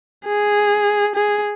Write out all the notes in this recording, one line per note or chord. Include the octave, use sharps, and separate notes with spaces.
G#4
G#4